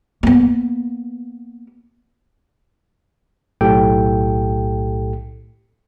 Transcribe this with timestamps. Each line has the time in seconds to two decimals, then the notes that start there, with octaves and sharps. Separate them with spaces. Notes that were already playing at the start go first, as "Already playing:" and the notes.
0.23 A#3 B3
3.61 B1 A2 G4 A4 G5